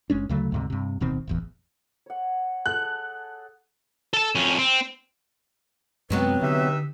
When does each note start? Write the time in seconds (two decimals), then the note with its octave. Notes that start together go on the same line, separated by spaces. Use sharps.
0.10 F#1 G#3 C#4 D4
0.29 D2 C#3 F#3 A3
0.52 D2 G#2 C3
0.70 G2 C3
1.00 D1 B2 D#3 C4
1.27 E1 A1 E2
2.06 C#5 F#5
2.66 G#4 A4 F#6
4.13 A4 A5
4.35 F2 C#4
4.59 C4
6.10 F#2 C3 F#3 G#3 B3 C4 B4
6.42 D3 D#4 G4 E5